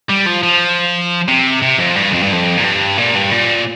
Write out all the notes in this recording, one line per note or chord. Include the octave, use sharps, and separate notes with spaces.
G3
F3
F3
C3
C3
F2
G2
F2
G2
F2
A#2
G2
A#2
G2
A#2